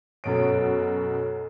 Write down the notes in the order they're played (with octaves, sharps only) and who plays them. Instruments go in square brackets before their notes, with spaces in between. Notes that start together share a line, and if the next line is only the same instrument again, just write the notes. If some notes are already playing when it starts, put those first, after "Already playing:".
[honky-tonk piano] F#2 B2 D7 [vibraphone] A4 C#5